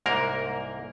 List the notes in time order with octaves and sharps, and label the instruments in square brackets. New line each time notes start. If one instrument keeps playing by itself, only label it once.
[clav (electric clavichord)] C2 G#2 A#3 A#4